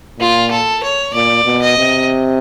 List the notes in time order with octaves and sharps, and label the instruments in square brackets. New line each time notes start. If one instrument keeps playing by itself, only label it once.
[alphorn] A#2 [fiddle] F4
[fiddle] A4
C#5
[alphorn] A#2 [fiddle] D5
[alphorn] B2
[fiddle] D#5
[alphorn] C3